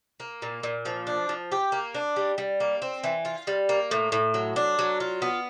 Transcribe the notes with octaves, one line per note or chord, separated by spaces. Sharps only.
A#3
A#2
A#2
F3
D4
F3
G4
A#3
D4
G3
G3
A#3
C4
E3
F4
G3
A#3
A2
A2
F#3
D4
F#3
F4
B3